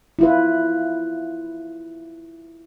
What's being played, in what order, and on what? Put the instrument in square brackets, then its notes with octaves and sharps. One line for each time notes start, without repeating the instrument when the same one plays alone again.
[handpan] E4 F4 B4